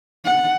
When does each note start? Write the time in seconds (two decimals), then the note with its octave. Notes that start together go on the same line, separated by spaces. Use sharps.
0.25 F#5